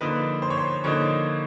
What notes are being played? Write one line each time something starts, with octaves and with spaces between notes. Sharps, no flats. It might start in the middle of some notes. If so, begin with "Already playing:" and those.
D3 F3 A#3 D#4 B4
C5
C#5
C5
D3 F3 A#3 D#4 C#5